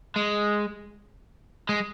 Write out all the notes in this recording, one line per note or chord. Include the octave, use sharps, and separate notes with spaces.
G#3
G#3